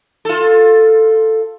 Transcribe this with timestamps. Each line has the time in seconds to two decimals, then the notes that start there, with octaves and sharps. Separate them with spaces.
0.25 F4 A4